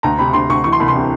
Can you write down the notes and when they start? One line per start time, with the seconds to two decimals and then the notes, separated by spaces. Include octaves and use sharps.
0.03 D2 A#5
0.18 C3 B5
0.33 D2 C6
0.49 D2 C#6
0.64 E3 C#6
0.73 C6
0.80 C2 B5
0.88 C6
0.96 C3